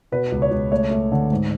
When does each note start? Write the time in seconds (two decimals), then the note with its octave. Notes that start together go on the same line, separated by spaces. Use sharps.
0.12 B2 B4
0.32 C#2
0.42 C#5
0.51 C#2
0.72 A3 C#5
0.91 A3
1.12 D3
1.31 G#2